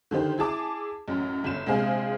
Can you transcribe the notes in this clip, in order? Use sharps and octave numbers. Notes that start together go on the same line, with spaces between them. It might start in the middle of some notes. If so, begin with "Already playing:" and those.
D3 D#3 G4 C5
E4 G#4 A5 D6
A1 F#2
G1 E7
A#1 C3 G#3 G#4 C5 F5